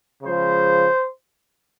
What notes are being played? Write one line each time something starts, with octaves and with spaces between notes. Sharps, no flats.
C#3 F3 G#3 C5